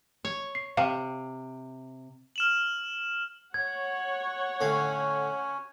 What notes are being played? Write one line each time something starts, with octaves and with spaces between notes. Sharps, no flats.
C#5
C7
C3 F5
F6 E7 F#7
C#5 F#5 G#6
A2 D3 C#4 F5